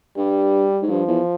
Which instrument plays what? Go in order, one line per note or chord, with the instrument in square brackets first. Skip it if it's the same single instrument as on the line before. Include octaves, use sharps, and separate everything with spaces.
[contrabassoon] G2 [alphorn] G3
[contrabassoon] G#2
[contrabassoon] G2 [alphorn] F3
[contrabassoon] E2